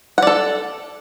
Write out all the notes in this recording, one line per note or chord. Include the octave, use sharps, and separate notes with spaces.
A4 D5 F#5